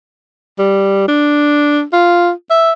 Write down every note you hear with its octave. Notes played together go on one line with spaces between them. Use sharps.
G3
D4
F4
E5